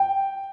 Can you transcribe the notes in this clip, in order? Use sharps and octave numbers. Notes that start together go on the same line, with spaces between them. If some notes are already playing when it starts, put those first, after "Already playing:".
Already playing: G5